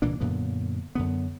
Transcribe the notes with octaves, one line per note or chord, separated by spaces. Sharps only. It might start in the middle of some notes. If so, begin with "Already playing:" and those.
C2 A#2 E3 D4
F#2 A#2 D3 B3
F#2 D3 B3